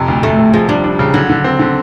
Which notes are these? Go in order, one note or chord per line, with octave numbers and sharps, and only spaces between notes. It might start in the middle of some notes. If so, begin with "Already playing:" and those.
Already playing: F2 C3
D2
D2 A3
C3
F3 G#3
G3 D4
D4
C#3
D3 F#3
D3
C4
D3